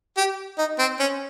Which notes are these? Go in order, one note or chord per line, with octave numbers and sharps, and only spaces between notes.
G4
D#4
C4
C#4